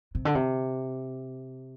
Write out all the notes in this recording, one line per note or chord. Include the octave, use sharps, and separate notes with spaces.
C3
D3
C3